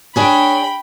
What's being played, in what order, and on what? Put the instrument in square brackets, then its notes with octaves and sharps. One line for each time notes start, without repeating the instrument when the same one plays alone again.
[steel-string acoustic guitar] D4 G#4 C#5 [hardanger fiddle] G5 B5